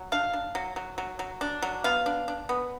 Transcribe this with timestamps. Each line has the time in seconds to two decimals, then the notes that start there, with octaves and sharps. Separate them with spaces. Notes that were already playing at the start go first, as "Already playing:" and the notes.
Already playing: F#3
0.12 D4 F5
0.33 D4
0.55 F#3
0.76 F#3
0.98 F#3
1.19 F#3
1.41 D4
1.62 F#3
1.84 B3 F5
2.06 D4
2.28 D4
2.49 B3